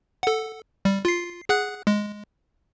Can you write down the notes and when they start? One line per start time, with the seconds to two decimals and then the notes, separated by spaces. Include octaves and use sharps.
0.23 A4 F#5
0.85 G3
1.05 F4 C7
1.49 G#4 F#5 F#6
1.87 G#3